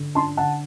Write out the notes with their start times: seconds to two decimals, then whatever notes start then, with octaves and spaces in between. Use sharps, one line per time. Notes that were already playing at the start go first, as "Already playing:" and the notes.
Already playing: D3
0.15 D4 A5 C6
0.37 D3 F#5 A5